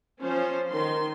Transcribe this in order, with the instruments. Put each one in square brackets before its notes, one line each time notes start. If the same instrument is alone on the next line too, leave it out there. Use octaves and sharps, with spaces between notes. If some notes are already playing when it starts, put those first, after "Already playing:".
[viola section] F3 C#4 C5
D#3 C6